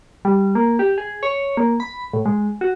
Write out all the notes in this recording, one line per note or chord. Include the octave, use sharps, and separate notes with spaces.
G3
A#3
G4
G#4
C#5
A#3
B5
A2
G#3
F#4